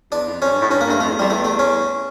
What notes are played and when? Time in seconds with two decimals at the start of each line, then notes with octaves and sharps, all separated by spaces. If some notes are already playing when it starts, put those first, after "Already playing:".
0.12 E2 D4
0.27 F2
0.41 F2 C#4
0.51 G2
0.61 A2
0.70 G2 C#4
0.81 A#3
0.86 G2 A3
1.00 F2 A3
1.10 E2
1.19 F2 G3
1.30 E2 A3
1.44 A3
1.59 C#4